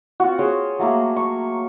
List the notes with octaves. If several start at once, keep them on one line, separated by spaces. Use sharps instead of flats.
C4 F4 F#4
G#4 C5 C#5 G5
F#3 A3 A#3
C#6